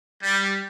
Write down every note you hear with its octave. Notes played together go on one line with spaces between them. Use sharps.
G3